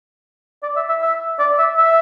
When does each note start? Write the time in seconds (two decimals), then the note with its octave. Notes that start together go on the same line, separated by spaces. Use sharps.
0.63 D5
0.76 E5
0.89 E5
1.02 E5
1.39 D5
1.59 E5
1.77 E5